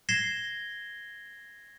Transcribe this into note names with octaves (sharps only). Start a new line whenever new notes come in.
G#6 A#6 C7 E7 G7